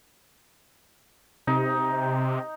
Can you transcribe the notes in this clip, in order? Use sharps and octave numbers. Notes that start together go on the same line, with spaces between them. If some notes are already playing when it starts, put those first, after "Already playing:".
C3 D#4